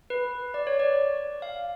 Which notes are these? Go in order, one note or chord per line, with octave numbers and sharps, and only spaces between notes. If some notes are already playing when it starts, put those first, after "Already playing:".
B4
D5
C#5
D5
F5